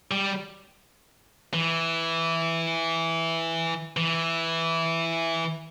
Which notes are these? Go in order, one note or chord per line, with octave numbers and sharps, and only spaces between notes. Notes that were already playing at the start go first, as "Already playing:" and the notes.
G3
E3
E3